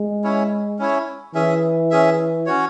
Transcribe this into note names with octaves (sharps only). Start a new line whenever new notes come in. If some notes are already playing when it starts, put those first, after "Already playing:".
Already playing: G#3
C#4 E4 C#5
C#4 E4 C#5
E3 C#4 G#4 E5
C#4 G#4 E5
C#4 F#4 C#5